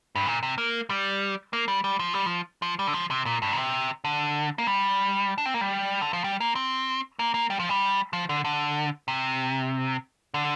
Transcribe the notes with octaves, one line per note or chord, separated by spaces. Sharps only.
G2
A#2
C3
A#3
G3
A#3
G3
G3
F3
G3
F3
F3
G3
D3
F3
C3
A#2
G2
A#2
C3
D3
A#3
G3
D4
C4
A#3
G3
D3
F3
G3
A#3
C4
A#3
A#3
G3
F3
G3
F3
D3
D3
C3
D3